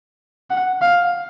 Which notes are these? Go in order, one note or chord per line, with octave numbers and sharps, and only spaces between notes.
F#5
F5